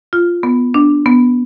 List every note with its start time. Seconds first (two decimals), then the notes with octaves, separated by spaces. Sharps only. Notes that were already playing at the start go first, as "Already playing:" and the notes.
0.13 F4
0.43 B3
0.74 D4
1.06 B3